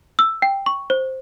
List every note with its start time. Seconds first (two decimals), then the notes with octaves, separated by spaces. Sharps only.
0.19 E6
0.42 G5
0.66 C#6
0.90 C5